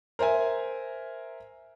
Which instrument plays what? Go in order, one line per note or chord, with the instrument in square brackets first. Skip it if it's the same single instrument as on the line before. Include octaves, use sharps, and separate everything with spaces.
[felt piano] A#4 C5 E5 G#5